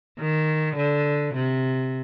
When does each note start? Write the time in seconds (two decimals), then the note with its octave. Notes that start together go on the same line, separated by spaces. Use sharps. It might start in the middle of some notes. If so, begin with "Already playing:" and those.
0.20 D#3
0.77 D3
1.35 C3